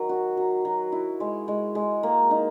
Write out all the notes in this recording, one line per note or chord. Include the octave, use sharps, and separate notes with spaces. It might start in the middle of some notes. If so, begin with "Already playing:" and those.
Already playing: D#3 F#3
F#4
F#3
F#3
E4
G#3
G#3
G#3
A#3
D#4